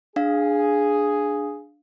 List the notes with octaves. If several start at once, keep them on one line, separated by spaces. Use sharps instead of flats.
D4 G#4 F5